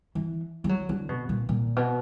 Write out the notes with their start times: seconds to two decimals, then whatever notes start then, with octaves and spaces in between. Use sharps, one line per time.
0.15 E3
0.64 G3
0.69 F#3
0.89 D3
1.09 B2
1.29 A#2
1.49 A#2
1.76 B2